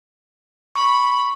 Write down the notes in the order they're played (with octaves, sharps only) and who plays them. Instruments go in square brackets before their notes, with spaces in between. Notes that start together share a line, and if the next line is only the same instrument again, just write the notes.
[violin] B5 [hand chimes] C#6